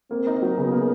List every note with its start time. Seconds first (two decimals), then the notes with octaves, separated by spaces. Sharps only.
0.10 A#3 C4
0.27 D#4
0.42 F#3
0.57 C#3 B3
0.72 A#3